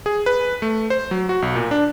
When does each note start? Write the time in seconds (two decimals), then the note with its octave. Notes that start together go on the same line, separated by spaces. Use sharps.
0.06 G#4
0.26 B4
0.62 A3
0.90 C5
1.11 F#3
1.29 F#4
1.42 B1
1.55 A#2
1.71 D4